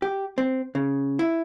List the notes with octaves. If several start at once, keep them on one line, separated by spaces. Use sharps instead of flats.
G4
C4
C#3
E4